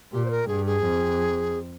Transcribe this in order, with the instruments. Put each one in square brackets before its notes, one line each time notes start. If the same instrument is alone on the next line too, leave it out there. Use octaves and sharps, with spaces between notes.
[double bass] A#2 [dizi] G4
[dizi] C5
A#4
[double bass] G2 [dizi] G#4
[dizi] G#4
[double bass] F2